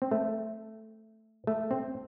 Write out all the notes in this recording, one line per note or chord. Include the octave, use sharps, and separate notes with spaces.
C4
A3
A3
C4